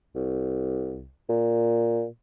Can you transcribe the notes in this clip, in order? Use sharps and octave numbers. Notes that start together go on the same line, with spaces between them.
C2
A#2